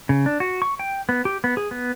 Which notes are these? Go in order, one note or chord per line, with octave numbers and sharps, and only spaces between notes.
C#3
D4
F#4
C#6
G5
B3
G4
B3
G#4
B3